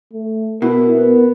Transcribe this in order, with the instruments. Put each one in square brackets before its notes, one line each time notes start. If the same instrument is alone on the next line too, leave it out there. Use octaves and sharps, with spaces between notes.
[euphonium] A3
[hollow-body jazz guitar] B2 [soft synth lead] E4 [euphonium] A#4
[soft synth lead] B3